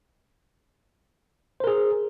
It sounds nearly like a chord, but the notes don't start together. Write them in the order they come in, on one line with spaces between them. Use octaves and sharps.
C5 A#4 G#4